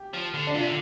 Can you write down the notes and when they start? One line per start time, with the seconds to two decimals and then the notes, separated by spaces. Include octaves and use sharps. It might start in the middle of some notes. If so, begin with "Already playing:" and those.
Already playing: G4
0.13 F3
0.34 D3
0.47 D4
0.54 C3 F4
0.66 D3